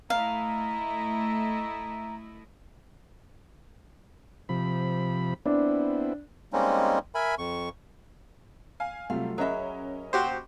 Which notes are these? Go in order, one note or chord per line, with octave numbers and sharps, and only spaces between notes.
A3 E4 D#5 F5 A#5
C3 F3 B5
B3 C4 D4 E4
G3 G#3 A#3 C4 C#4 D#4
A#4 E5 G#5 B5
F2 C#6
F5 G#5
C3 F#3 G3 A3 F4 F5
F#3 C#4 G#4 A#4 D#5 E5 B5
A#2 F#4 G4 C5